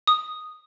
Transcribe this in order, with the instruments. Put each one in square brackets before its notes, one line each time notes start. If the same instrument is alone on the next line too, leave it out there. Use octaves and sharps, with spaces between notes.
[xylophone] D#6